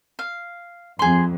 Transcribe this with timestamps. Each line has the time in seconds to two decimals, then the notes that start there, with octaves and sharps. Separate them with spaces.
0.19 F5
0.99 F2 G#4 C6